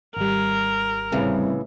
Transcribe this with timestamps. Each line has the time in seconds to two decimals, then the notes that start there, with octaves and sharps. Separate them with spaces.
0.17 G#1 G3 A#4
1.12 C2 A2 C#3 E3